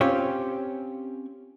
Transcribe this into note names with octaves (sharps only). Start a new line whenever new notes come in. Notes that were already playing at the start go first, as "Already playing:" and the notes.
C4 C#4 F4 G4 C#5